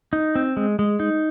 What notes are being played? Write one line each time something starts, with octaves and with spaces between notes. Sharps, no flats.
D#4
C4
G#3
G#3
D#4